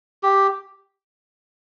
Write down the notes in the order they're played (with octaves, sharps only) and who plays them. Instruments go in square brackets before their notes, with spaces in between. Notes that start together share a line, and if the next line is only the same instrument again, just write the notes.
[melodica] G4